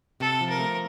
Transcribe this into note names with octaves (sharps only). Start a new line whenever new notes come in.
C3 A4
F3
A#4
A3